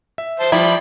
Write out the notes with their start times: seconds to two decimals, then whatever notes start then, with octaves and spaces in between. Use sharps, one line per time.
0.18 E5
0.40 C5 A5
0.52 F3 E4 D5 G5 B5